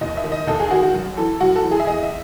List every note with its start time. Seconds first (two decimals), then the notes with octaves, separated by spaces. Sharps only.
0.01 D#2 D#5
0.17 E5
0.24 D#3
0.32 D#5
0.47 D#2 A4
0.60 G#4
0.71 D#3 F#4
0.83 F#4
0.94 F#2
1.17 E3 A4
1.40 F#2 F#4
1.56 A4
1.63 E3
1.71 G#4
1.80 E5
1.87 E2 D#5
2.03 E5